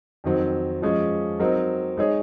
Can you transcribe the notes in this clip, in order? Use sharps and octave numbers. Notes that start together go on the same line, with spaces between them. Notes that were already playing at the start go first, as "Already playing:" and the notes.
F2 D#3 F#3 C4
F3 G#3 C#4
F#3 C4 D#4 A#4
G#3 D#4 G#4 C#5